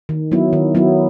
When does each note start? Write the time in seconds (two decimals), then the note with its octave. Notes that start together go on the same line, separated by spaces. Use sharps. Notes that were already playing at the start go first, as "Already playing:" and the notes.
0.09 D#3
0.32 F#3 B3 E4
0.53 D#3
0.75 F#3 B3 E4